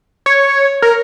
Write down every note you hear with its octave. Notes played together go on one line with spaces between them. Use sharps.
C#5
A#4